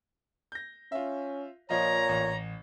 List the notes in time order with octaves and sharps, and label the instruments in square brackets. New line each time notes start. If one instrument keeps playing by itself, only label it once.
[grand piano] G6 A#6
[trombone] C#4 [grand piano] F4 E5
[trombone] A#2 [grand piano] F3 F4 D#5 [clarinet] C#5 [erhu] A#5
[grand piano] A1